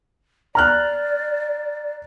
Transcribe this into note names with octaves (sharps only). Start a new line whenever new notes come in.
D5 A#5 F6 F#6